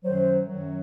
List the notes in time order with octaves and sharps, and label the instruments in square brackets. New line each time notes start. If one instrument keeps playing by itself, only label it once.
[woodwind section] F#2 D#3 F#3 [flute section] C5
[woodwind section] F#2 D#3 F#3